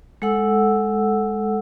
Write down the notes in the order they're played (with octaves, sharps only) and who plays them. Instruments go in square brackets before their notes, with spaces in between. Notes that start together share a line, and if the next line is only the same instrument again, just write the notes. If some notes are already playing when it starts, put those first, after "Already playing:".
[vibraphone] G#3 A4 F#5 E6